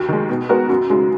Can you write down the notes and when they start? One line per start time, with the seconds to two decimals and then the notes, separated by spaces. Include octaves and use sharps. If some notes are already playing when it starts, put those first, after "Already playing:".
Already playing: D#2 F#4
0.09 D#3 G#3
0.29 B2
0.49 G#3 B3 F#4 A#4
0.69 F#2 F#4
0.90 C#3 G#3 F#4